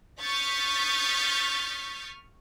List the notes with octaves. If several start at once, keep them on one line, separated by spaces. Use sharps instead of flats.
C#6 D#6 F6 G6 A6 B6